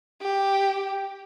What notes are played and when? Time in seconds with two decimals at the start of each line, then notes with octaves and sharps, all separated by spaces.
0.22 G4